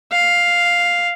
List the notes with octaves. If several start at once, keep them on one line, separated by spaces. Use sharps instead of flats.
F5